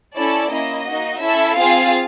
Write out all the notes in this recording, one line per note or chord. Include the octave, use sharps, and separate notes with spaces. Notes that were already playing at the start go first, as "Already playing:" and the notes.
C#4 E4 A4 D5
A#3 C#4 E4 D#5
A#3 D#4 F#4
C#4 E4 A4 E5
C4 F4 G#4 F5